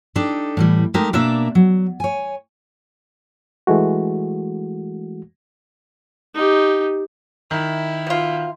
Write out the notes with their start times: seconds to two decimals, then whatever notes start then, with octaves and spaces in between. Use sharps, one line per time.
0.16 D4 D#4 G4 A4
0.57 A2 E3 G3
0.94 G#3 A3 D#4 G4 A#4
1.13 B2 A#3 D4 A#4 D5 E5
1.55 F#3
2.00 C#5 G#5
3.67 E3 G#3 A3 F#4
6.35 D#4 G4
7.51 D#3 E4 E5
8.07 B2 F4